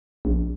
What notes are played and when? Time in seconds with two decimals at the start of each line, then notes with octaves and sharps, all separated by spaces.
0.25 A#1